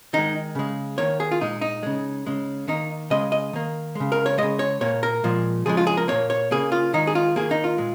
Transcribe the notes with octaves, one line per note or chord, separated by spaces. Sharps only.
D#3 G#3 D#4
C#3 G#3
D#3 A#3 C#5
G#4
F4
A#2 G#3 D#4
D#4
C#3 G#3
C#3 G#3
D#3 A#3 D#4
C#3 G#3 D#5
D#5
D#3 A#3
C#3 G#3
A#4
C#5
C#3 G#3 D#5
C#5
A#2 A#3 C#5
A#4
A#2 F3 G#3
C#3 F3 G#3 G#4
F4
G#4
A#4
A#2 A#3 C#5
C#5
C#3 A#3 G#4
F4
D#3 G#3 D#4
G#4
F4
D#3 A#3 G#4
D#4
F4
A#2 G#3